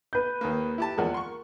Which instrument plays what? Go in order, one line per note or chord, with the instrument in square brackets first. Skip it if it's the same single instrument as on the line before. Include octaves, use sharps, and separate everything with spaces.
[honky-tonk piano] B4 G6
[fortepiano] D#2 D#3 A#3
E4 G4 A5
[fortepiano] E2 F3 G#3 [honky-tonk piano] A#4 F#5
[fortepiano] C6 C#6